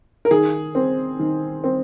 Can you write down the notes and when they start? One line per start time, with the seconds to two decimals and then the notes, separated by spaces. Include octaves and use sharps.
0.25 A#4
0.31 D#3 G#4
0.75 C4
1.19 D#3
1.64 C4